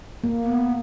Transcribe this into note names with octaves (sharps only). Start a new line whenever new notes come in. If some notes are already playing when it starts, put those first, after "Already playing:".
A#3
B3